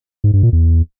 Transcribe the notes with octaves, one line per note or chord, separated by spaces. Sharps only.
G#2
G2
A#2
E2